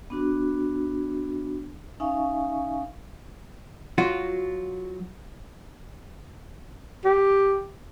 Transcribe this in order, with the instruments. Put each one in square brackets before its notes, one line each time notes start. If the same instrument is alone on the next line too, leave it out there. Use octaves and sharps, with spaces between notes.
[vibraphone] B3 D4 F#4
C#4 D#4 E5 F5 G#5 C#6
[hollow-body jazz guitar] F#3 F4 F#4
[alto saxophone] G4